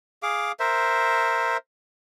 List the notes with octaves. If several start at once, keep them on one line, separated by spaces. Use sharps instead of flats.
G#4 F5 D6
A#4 C5 E5